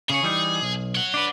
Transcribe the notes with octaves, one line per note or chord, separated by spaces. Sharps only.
C#3 G#4 C#5
E3 G3 D#4
B1
C#5 F#5
D4 B4